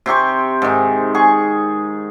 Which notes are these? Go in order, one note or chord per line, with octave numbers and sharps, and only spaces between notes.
C3 C4 G4 C#6
G#2 D#3
G#4 C#6